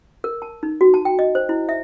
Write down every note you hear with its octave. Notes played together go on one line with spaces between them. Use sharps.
A#4
A5
D#4
F#4
A5
G5
D#5
C5
E4
E5